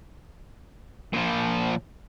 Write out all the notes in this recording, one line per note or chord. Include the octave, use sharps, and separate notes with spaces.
A#2 F3